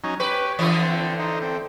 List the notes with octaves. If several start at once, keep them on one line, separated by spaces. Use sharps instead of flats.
F#3 C#4 D#4
G4 B4 C#5
D3 E3 A3 D#6
C4
D#4 C5
C4